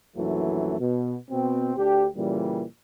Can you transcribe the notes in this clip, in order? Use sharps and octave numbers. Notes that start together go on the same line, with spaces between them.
A#1 F#2 E3 F#3 A3
B2
B2 C4
D2 D4 G4
A#2 C#3 E3 G3